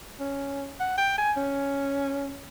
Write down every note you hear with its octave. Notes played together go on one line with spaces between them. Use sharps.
C#4
F#5
G5
G#5
C#4